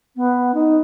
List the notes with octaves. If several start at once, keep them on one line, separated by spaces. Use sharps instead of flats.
B3
D#4